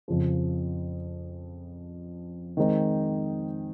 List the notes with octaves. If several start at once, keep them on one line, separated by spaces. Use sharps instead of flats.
F2 C#3 F3
D#3 G#3 C4 D#4